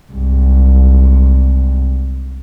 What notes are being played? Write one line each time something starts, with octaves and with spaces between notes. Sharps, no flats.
C2 G#2